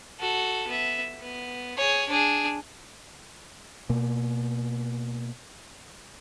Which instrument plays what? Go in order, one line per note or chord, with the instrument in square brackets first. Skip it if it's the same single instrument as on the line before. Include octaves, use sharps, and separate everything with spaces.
[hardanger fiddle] F#4 A4
B3 E5
B3
G#4 C#5
D4 G#4
[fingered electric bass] B2 A#3